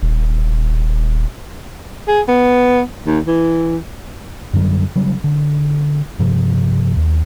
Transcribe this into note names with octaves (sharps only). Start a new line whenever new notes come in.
D#1
G#4
B3
D#2
E3
F#2 D3 F#3 G3
C#3 F#3 G3
D3
G2 C3 F3
D#2